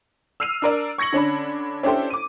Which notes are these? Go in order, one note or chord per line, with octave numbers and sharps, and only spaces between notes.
E6 F6 C7 D#7 F7
D4 A#4 D5
C#6 G#6 A#6 C#7 F#7
D3 C#4 D4 B5
C#4 D4 E4 G4 A4 C5
D6 D#7